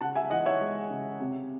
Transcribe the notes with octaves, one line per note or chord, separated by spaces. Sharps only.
C#3 F#5 A5
E5 G#5
E3 D#5 F#5
C#5 E5
G#3
C#3
C3